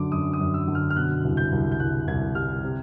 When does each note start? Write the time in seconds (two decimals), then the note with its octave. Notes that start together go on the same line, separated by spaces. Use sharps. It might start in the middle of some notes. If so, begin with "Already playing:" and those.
Already playing: F#2 D3 F#3 D6
0.12 F#2 D#6
0.33 D#6
0.40 F#2
0.54 E6
0.68 D3
0.75 F6
0.90 F6
0.96 B2 F#6
1.24 C2
1.37 G6
1.52 C2
1.72 G6
1.79 C2 F#6
2.07 C2 G#6
2.35 G3 F6
2.63 C3